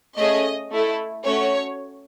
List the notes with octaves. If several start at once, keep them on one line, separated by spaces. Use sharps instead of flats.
A3 C#4 G#4 D#5
A3 E4 A4
A3 C#4 F#4 C#5